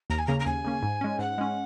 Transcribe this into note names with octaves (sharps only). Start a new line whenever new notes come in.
D#2 A#5
G#5
C#3 A#3 C#4 A#5
A#5
D#2 G#5
C#3 A#3 C#4
G#2
G#3 C#4
G#2 F#5
G#3 C#4